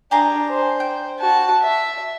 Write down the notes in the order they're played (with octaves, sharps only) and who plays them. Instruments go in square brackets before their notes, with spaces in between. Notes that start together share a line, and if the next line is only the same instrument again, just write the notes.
[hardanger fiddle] D4 [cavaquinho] G4 G#4 A#5
[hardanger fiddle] C5
[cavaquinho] G5
[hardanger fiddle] F#4 A5
E5